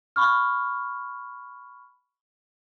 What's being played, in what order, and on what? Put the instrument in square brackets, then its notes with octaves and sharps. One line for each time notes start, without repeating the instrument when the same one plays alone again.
[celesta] B5 C#6 F6